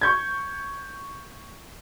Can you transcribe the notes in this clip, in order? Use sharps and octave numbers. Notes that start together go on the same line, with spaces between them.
C#6 G6 G#6